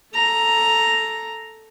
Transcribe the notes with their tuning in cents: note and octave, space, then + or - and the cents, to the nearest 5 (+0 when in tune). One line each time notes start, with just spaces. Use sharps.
A4 +0 A#5 +0